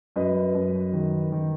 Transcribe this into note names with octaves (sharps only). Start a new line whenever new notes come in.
F#2 B4 D#5
F#2
D#3
D#3